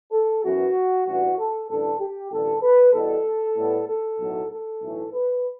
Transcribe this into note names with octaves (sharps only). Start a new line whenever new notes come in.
A4
F#2 E3 B3 F#4
A1 G2 E3 F#4
A4
A1 G2 D3 A4
G4
A1 G2 D3 A4
B4
E2 B2 G3 A4
A2 G3 B3
A4
B1 A2 F#3 A3
A4
B1 A2 E3 A3
B4